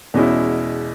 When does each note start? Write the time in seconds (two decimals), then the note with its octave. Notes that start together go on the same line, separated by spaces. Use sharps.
0.14 E2 B2 G#3 C#4 E4